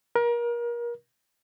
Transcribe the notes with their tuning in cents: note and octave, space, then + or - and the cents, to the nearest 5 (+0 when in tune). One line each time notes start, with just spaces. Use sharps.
A#4 +30